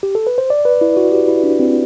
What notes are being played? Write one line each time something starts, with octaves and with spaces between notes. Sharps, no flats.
G4
A4
B4
C5
D5
B4
E4
F#4
G4
E4
D4
C4